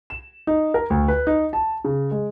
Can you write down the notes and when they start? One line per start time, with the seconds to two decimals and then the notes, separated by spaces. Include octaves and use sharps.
0.10 E7
0.47 D#4
0.74 A#4
0.90 D2
1.08 B4
1.27 D#4
1.53 A5
1.85 C#3
2.11 G#3